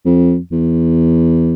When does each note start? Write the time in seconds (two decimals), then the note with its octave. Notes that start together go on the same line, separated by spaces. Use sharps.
0.06 F2
0.52 E2